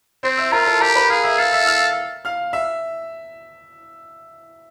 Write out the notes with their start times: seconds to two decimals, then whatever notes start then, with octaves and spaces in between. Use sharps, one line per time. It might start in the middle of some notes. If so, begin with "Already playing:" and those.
0.23 C4 C5 C6
0.37 E5 E6
0.52 F4 A#4 A#5
0.66 A4 A5
0.81 G4 A#4 A#5
0.95 B4 B5
1.09 G#4 F5 F6
1.24 E5 E6
1.38 A4 F5 F6
1.52 E5 E6
1.67 F5 F6
2.25 F5 F6
2.53 E5 E6